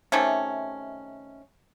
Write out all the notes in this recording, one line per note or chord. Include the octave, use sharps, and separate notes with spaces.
C3 D#3 A3 C#4